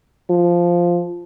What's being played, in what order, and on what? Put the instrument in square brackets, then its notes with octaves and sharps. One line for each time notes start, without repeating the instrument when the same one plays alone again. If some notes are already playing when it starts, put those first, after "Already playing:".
[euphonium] F3